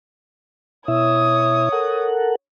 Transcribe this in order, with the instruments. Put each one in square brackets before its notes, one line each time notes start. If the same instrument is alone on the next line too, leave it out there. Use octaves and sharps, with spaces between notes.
[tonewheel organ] B2 E4 E5 [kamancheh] C#5 D#6
[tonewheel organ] A4 A#4 F#5